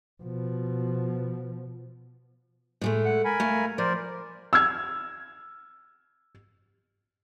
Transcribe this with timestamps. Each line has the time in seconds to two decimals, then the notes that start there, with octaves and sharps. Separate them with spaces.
0.23 B2 F3
2.81 A2 G#3 A3
3.05 F#5
3.25 A#4 G#5 B5
3.40 A3 F5
3.78 F3 A#4 C5 D5
4.53 E6 F6 G#6